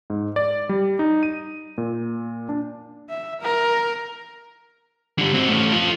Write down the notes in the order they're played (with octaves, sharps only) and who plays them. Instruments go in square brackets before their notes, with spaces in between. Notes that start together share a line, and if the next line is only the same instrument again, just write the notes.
[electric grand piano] G#2
D5
G3
D#4
D#7
A#2
D4
[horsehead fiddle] E5
A#4
[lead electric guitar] D3 G3
C4 F#4
A3 C#4
F4 A4